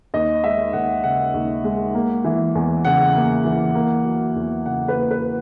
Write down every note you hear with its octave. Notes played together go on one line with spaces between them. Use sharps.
D#2 D#5
G#3 E5
D#2 F#5
C#3 F#5
D#2
G#3
A#3
E3
E2
C#3 F#5
A#3
E3
A#3
F#3
E2
C#3 F#5
B4
A#3
B4